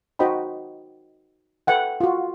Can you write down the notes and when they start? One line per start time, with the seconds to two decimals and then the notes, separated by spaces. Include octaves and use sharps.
0.19 D#4 F#4 C5 D#5 G5 B5
1.67 A4 B4 E5 F#5 G5
2.01 F4 F#4